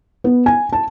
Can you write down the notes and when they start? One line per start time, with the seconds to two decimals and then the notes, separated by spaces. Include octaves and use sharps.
0.24 B3
0.46 G#5
0.73 A5